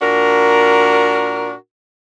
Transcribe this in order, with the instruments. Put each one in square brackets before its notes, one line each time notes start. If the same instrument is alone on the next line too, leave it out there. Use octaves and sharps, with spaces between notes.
[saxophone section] A#2 D4 F#4 A#4